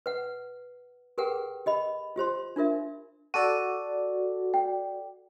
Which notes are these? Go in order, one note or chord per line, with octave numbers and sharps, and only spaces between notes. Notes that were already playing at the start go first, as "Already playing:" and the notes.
B4 F#5
G4 G#4 A#4 B4 F#5 G5
G4 D#5 B5
F4 G4 C5 C6
D4 F4 A#4 E5
F#4 A4 D5 D#7
G5